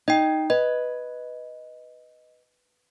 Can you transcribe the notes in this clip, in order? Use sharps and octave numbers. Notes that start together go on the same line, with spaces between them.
D#4 D#5 G5
B4 D#5